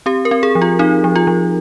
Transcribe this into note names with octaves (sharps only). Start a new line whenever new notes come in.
C4 G4
A#4
C4
G#4
F3
F4
C4 D#4
F3
F4
F3